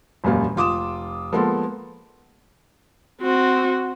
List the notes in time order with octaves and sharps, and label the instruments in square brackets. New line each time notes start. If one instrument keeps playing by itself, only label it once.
[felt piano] E1 F#2 A#2 G3 A#3 F5
F1 F4 D6 D#6 E7
F3 G#3 A#3 B3 A4
[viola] C4 F#4